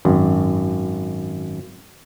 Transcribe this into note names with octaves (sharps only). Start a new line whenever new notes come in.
G#1 F#2